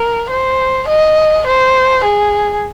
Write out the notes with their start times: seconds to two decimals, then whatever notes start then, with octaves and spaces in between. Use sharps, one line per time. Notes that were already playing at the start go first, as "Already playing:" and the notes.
Already playing: A#4
0.31 C5
0.89 D#5
1.47 C5
2.05 G#4